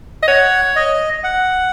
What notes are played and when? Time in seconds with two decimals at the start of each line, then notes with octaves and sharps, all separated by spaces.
0.23 D#5
0.28 C#5 F#5
0.76 D#5
1.24 F#5